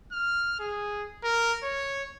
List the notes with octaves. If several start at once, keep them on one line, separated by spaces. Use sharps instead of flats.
F6
G#4
A#4
C#5